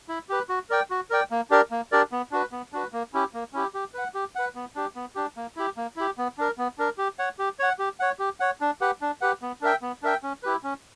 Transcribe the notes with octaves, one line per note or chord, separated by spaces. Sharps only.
E4
G4 B4
F#4
A#4 D5 G5
F#4
A#4 D5 G5
A#3
D4 G4 A#4 D5
A#3
D4 G4 A#4 D5
B3
D4 F#4 B4
B3
D4 F#4 B4
A#3
C#4 E4 G4
A#3
C#4 E4 G4
G4
B4 F#5
G4
B4 F#5
B3
D4 G4
B3
D4 G4
A#3
E4 G4
A#3
E4 G4
B3
D4 A#4
B3
D4 A#4
G4
C#5 F#5
G4
C#5 F#5
G4
C#5 F#5
G4
C#5 F#5
D4
G4 B4 F#5
D4
G4 B4 F#5
B3
D4 A#4 E5 G5
B3
D4 A#4 E5 G5
C#4
E4 G4 B4
C#4